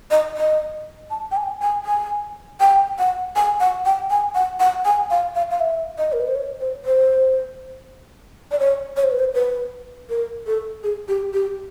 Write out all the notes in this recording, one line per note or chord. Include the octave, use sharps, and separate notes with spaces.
D#5
D#5
A5
G5
G#5
G#5
G#5
G5
F#5
G#5
F#5
G5
G#5
F#5
F#5
G#5
F5
F5
F5
E5
D#5
A#4
B4
C5
C#5
C5
C5
D5
C#5
C#5
C5
B4
C5
B4
A#4
A4
G#4
G4
G4